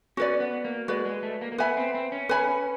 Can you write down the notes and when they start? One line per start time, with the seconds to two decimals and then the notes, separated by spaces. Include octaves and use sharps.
0.17 C#4 F#4 B4 D5
0.40 B3
0.65 A#3
0.88 G#3 F#4 B4 D5
1.05 G#3
1.23 A3
1.41 A#3
1.52 A#3
1.58 B3 B4 E5 G#5 B5
1.77 C4
1.94 C4
2.12 C#4
2.29 B4 E5 G#5 B5